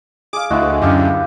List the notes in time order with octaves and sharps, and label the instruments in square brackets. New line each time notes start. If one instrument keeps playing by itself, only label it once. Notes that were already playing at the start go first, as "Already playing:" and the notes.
[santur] G#4 F5 [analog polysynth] D6
[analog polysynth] D2 D3 [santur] G#3 E4 F#4
[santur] G#4
[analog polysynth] F#2 D3 [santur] G4 E5 F5